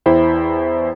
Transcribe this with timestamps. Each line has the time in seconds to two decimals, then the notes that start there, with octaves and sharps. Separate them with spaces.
0.06 E2 E4 C5 G5 B5